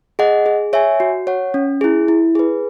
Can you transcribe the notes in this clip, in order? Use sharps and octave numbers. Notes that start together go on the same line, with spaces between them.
G#4 D#5 F#5
G#4
C#5 E5 G#5
F#4
C#5 F#5
C#4
E4 G#4
E4
G#4 B4